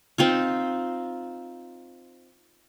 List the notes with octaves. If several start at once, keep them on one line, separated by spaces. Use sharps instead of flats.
C4 D#4 F4